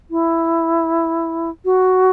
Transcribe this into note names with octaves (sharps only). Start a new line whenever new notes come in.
E4
F#4